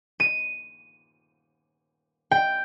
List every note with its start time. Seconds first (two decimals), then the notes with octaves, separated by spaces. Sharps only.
0.20 D#7
2.31 G5